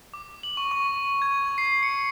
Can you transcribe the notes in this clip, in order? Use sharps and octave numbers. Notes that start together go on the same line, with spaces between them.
D6
F#7
C#6
C#6
G#6
C7
C#7